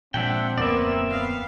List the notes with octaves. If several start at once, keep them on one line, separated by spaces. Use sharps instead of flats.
A#2 F3 G#3 C4 D4 E5 F#5 G5
D1 F2 A#3 B3 D5 E5
B3 F5